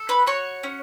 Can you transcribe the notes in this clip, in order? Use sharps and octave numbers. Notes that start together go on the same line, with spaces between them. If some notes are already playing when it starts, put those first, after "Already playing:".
Already playing: A4
B4 B5
F#4 C#5 C#6
C#4